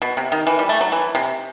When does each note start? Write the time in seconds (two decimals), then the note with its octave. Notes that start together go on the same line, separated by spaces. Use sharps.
0.02 B2
0.17 C3
0.32 D#3
0.47 E3
0.59 G3
0.69 A3
0.81 F#3
0.92 E3
1.15 C3